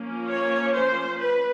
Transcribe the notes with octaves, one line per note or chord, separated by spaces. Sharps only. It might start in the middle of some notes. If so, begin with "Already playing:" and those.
Already playing: F3 A#3 C#4
C#5
C5
B4